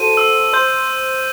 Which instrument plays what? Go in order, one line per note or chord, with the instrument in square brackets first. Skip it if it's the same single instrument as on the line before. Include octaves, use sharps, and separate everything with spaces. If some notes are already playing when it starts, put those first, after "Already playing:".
Already playing: [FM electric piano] F#4 A4 C5 [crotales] D#7
[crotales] E6
[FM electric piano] C5 [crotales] G6